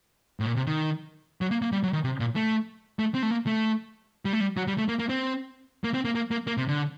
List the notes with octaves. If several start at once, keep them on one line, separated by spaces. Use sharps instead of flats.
A2
A#2
C3
D#3
F#3
A#3
A#3
G3
F#3
D#3
C3
A#2
A3
A3
C4
A3
A#3
A3
G3
A3
G3
F#3
G3
A3
A#3
A#3
C4
A#3
C4
A#3
A#3
A#3
A#3
C3
D3